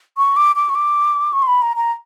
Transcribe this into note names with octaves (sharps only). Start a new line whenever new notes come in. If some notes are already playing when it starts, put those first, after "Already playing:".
C#6
D6
D6
C#6
D6
C#6
C6
B5
A#5
A#5